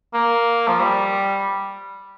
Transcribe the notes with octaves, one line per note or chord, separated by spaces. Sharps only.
A#3
F3
G3